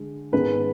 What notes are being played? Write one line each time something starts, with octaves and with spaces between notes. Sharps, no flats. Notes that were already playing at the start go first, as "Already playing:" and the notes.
Already playing: D3 G#3
G#2 D#3 G#3 B3 B4